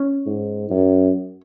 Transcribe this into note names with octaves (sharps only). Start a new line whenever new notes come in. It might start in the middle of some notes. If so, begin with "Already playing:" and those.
Already playing: C#4
G#2
F#2